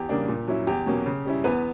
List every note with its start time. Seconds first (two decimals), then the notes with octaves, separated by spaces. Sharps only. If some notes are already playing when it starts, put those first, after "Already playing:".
Already playing: E2 G4
0.09 C#3 G3 A#3 D4
0.28 A#2
0.47 F#3 C#4 E4
0.67 E2 G4
0.86 B2 F#3 A#3 C#4
1.06 C#3
1.25 G3 C#4 E4
1.44 E2 B3 B4